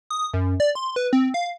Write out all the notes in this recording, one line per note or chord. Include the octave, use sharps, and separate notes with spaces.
D#6
F#2
D5
C6
B4
C4
F5